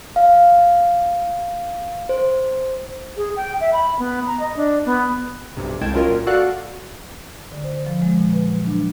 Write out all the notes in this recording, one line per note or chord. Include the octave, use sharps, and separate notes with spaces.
F5
C5
G#4
G5
E5
B5
B3
A#5
D#5
D4
B3
B1 G2 C3
C2 G#3 G5 A5 G#6
F#3 C#4 F4 A#4 D#5
A#2
F#4 A4 D5 F5 F#5 F#6
D3
C5
F3
G#3
A#2
B4
F#3
D4